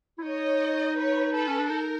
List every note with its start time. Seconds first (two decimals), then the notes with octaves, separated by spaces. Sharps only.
0.19 E4
0.23 D#4 C#5 D#5
0.96 B4 C#5
1.34 A4 B4
1.48 C#4
1.59 D4
1.69 D#4 A#4